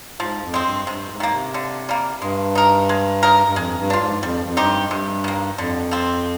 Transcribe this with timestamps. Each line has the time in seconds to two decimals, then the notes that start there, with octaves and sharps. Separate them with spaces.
0.20 G#2 F3
0.43 F2
0.54 G#3 C4
0.65 G2
0.87 G2 C3
1.10 G#2
1.20 D#3 A#3
1.32 C3
1.54 D3
1.89 G3 A#3
2.22 G2 G#3
2.55 D#4 A#4
2.89 G#3
3.23 D#4 A#4
3.49 G2
3.55 F2 G#3
3.78 G2
3.90 D4 F4
4.01 G#2
4.23 F2 G3
4.46 F2
4.57 G2 C4 D#4 G4
4.90 G2 C3
5.24 D#3 A#3
5.57 F2 D3
5.91 F3 C4